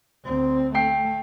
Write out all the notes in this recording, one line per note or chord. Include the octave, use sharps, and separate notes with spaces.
D2 C4
A3 G5 C7